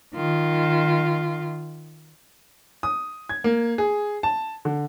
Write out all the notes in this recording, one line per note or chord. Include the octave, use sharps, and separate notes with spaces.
D#3 F4
D#6
G#6
A#3
G#4
A5
D3